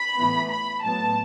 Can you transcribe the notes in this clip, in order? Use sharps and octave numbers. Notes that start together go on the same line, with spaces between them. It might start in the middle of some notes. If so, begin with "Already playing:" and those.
Already playing: B5
A2 E3 B3
B5
A2 F#3 B3 A5